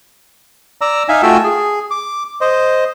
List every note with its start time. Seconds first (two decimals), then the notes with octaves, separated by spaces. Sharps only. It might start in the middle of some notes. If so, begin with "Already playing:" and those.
0.81 D5 A#5 E6
1.09 D#4 E5 F5 G#5
1.23 A3 F4 F#4 G5 G#5 E6
1.44 G#4
1.91 D6
2.41 C5 D#5